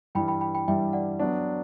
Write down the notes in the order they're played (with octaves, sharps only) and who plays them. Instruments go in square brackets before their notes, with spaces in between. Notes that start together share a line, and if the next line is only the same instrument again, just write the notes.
[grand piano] G2 E3 G3 [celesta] G5 B5
[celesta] G5 B5
G5 B5
G5 B5
[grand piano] G2 E3 G3 [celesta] E5 G5
[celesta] D5 F#5
[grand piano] F#3 B3 D4